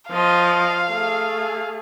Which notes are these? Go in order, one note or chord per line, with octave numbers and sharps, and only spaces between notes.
F3 D#5 F5
A3 G#4